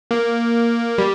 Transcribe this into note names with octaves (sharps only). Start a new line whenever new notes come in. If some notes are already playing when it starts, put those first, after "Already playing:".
A#3
G3